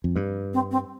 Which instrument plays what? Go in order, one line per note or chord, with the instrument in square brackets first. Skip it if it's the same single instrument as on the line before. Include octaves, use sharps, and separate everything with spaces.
[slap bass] F2
G2
[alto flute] C4
C4